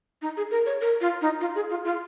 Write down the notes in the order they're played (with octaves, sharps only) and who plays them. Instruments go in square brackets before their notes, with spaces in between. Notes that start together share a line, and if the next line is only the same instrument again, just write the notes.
[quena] D#4
G#4
A#4
C#5
A#4
F4
D#4
F4
G#4
F4
F4